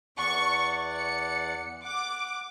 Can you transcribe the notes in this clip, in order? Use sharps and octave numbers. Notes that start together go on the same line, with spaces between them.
E2 D5 F#5 C#6
C#7
F#5 D6